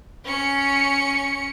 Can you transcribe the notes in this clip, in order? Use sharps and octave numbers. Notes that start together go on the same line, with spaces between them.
C#4 C#7